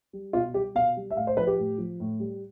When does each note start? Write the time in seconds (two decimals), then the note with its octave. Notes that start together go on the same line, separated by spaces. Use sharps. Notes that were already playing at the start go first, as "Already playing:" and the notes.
0.13 G3
0.33 B2 F4
0.54 G3 G4
0.75 B2 F5
0.97 G3
1.11 E5
1.16 A2 F5
1.27 C5
1.37 F3 B4
1.47 G4
1.59 A2
1.78 F3
2.00 A2
2.20 G3